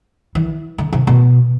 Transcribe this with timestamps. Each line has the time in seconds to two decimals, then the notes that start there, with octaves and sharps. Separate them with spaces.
0.35 E3
0.78 D3
0.93 C3
1.07 B2